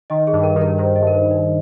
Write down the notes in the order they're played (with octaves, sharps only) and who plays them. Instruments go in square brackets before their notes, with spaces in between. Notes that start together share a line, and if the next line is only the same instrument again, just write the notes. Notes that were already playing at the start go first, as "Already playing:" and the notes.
[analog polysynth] D#3 [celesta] D#5
[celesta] G#4
[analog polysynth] G2
[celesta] A#4
[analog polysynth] D#3
[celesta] A#4
[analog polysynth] D#3 [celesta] C5
[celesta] D#5
[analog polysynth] G2
[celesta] A#4
C5
[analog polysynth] G2
[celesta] D#4